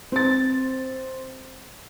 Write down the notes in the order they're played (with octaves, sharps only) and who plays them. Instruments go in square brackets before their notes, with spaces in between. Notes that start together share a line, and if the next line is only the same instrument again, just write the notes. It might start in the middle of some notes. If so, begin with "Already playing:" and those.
[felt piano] C4 A6